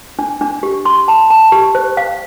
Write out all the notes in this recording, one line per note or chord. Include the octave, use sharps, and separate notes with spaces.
D4
D4
G4
C6
A5
A5
G4
C5
F5